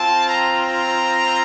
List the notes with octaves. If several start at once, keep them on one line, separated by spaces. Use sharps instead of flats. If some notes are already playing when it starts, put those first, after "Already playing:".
Already playing: C4 F4 A5
A#5
A#5